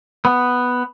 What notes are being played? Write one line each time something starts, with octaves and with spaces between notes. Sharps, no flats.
B3